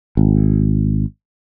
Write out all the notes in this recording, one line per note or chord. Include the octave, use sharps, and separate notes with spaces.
G#1